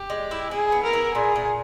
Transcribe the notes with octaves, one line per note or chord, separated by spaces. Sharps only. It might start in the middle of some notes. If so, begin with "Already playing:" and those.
Already playing: G4
G#3
E4
E4 G#4
B3
A#4
E4
A#2 G#4
A#2